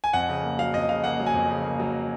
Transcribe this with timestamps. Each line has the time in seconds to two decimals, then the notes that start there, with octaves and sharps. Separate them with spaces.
0.04 G#5
0.13 F2 F#5
0.29 C#3
0.43 A#3
0.59 F#3 F5
0.74 F2 D#5
0.89 C#3 F5
1.04 A#3 F#5
1.20 F#3
1.27 G#5
1.34 F2
1.50 C#3
1.65 A#3
1.80 F#3